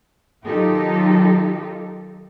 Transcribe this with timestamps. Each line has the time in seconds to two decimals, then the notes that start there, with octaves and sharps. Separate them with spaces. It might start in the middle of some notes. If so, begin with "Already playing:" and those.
0.44 D#3 F#3 D#4 F4 G4 A4